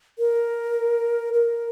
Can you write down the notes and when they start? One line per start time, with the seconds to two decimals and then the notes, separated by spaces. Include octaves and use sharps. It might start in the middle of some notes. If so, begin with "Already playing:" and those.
0.19 A#4
1.34 A#4